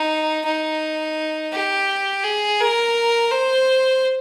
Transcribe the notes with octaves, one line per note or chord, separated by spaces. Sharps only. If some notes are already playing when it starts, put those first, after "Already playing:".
Already playing: D#4
D#4
G4
G#4
A#4
C5